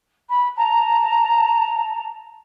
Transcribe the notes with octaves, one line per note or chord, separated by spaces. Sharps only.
B5
A5 A#5